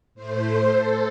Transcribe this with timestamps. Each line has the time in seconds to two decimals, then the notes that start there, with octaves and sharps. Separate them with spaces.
0.15 A2 A3 C5
0.68 A4